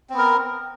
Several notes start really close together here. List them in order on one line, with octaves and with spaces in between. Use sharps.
C4 B3 A#4